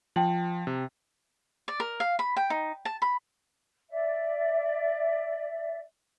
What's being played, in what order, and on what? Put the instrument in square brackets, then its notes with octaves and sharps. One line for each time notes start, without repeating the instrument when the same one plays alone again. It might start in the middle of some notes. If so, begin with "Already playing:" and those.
[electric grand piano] F3 [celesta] G5 A5 F#7
[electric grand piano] C3
[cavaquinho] D5
A#4
F5
B5
G5
D#4
A5
B5
[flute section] D5 E5